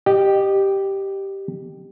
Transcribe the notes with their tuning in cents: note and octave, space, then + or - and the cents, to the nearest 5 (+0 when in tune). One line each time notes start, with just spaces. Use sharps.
G4 -5 D#5 -25